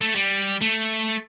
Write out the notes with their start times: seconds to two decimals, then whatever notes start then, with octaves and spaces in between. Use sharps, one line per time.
0.01 A3
0.15 G3
0.61 A3